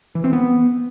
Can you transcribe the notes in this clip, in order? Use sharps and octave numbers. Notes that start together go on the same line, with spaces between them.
E3
C4
B3